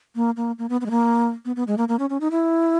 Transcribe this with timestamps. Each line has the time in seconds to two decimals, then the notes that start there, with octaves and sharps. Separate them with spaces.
0.15 A#3
0.37 A#3
0.59 A#3
0.69 B3
0.81 B3
0.86 G#3
0.90 A#3
1.45 B3
1.56 B3
1.67 G#3
1.78 A#3
1.88 A#3
1.99 C#4
2.10 C#4
2.21 D#4
2.31 E4